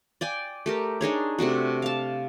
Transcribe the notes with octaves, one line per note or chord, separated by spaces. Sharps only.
D5 G5 G#5
A3 G4 A#4
D4 D#4 G#4 C#5
C3 A3 D4 F#4
F5 A5